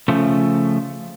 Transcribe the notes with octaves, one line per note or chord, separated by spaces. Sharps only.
C#3 F3 A3